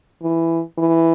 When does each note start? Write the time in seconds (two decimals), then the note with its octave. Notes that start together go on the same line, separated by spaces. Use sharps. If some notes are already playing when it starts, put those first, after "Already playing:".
0.22 E3
0.78 E3